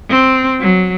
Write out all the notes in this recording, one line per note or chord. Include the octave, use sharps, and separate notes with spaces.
C4
F#3